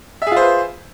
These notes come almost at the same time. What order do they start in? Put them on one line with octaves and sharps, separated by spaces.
E5 G#4 F4 C5 B4